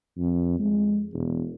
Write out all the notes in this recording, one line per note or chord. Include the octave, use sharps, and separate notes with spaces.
F2
G#3
E1